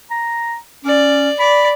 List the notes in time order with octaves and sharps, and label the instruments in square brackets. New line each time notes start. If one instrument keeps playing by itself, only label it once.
[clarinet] A#5
[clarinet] C#4 [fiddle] D5
[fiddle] D5 [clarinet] B5